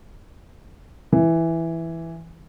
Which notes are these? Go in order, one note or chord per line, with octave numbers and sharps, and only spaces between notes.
E3